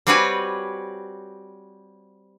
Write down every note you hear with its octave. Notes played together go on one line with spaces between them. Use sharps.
G3 C4 F#4 B4 C#5 G#5